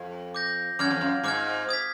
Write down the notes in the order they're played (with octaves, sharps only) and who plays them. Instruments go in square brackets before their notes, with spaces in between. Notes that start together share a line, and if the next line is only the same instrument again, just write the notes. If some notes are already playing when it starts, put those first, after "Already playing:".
Already playing: [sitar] F2
[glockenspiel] D6 G6 A#6
[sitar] F#2 [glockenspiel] D6 F6 G#6
[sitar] F2
F#2
[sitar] G#2 [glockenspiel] D6 F6 G#6
[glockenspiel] D#6 G#6 B6